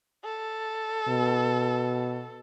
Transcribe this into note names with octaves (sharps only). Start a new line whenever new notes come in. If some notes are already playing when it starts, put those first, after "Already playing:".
A4
B2